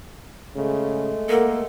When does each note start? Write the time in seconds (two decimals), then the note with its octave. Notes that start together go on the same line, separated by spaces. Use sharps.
0.55 C#3 G#3 A3
1.29 A#3 A4 A#4 F#5